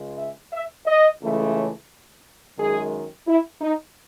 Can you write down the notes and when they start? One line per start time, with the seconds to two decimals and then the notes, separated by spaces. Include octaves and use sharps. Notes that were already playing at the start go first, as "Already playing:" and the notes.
Already playing: C#2 C#3 G#3
0.18 E5
0.53 E5
0.86 D#5
1.21 C#2 C#3 E3 A3
1.55 C#5
2.58 F#2 D#3 G#3 G#4
3.27 E4
3.61 D#4